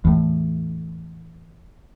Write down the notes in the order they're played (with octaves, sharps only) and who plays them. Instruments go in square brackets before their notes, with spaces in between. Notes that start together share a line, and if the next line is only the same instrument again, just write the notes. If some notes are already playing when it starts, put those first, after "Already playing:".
[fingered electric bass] E2 A2